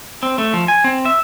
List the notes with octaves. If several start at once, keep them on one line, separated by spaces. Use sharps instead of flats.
C4
A3
F3
G#5
C4
E5